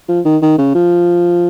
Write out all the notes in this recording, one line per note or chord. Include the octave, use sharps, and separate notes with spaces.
F3
D#3
D#3
C#3
F3